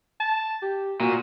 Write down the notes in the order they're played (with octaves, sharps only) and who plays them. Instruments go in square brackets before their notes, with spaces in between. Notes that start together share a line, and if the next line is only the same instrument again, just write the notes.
[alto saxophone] A5
G4
[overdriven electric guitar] A#2 [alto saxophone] F#4